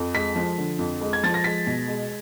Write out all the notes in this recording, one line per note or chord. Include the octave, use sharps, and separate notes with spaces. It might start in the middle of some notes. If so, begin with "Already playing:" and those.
Already playing: F2
G#3 B6
F3
D3
F2
G#3
G#6
F3 A6
A#6
G#3 B6
B2
G#3